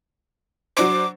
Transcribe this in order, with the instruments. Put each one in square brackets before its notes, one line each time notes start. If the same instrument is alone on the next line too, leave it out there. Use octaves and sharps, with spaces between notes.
[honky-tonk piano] F#3 D4 C5 [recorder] D6